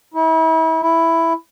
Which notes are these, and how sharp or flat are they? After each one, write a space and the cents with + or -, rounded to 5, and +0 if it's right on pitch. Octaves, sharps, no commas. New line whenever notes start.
E4 -35
E4 +5